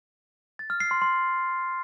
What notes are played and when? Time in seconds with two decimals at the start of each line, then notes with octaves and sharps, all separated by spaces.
0.59 A6
0.70 F6
0.80 C7
0.91 C6
1.02 C6